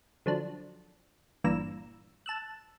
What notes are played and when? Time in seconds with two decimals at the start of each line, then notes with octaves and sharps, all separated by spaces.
0.26 D3 F3 F#3 D4
1.44 G1 G2 A#2 E3 A#5 E6
2.26 A5 E6 F#6